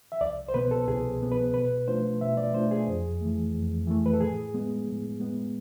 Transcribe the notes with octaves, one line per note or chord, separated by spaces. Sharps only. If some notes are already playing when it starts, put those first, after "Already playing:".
E5
C2 D5
C5
B2 B3 B4
A4
C2 G#4
B2 B3
B4
B2 B4
A3 D4 F4 C5
B2 E5
D5
A3 D4 F4 C5
G#4
F2
E3 A3
F2
E3 A3
B4
A4
A2 G#4
G#3 B3
A2
G#3 B3